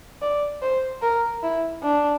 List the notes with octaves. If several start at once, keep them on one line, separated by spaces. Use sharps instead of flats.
D5
C5
A#4
E4
D4